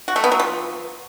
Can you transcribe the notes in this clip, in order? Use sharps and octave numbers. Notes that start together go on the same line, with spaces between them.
F#4
A3
B3
F#3
F3